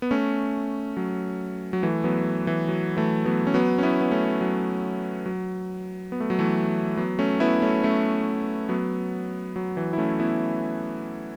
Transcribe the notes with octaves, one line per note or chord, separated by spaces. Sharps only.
B3
A3 C#4
F#3
F#3
E3 A3
F#3 B3
E3
F#3
E3 A3
F#3 B3
C#4
F#3 B3
C#4
B3 E4
B3
A3 C#4
F#3
F#3
B3
A3
F#3
E3 A3
F#3 B3
A3 C#4
B3 E4
A3 C#4
A3 C#4
F#3 B3
F#3
E3
E4
A3 C#4
B3 E4